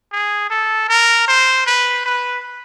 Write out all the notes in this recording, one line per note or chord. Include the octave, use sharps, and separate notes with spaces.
G#4
A4
A#4
C5
B4
B4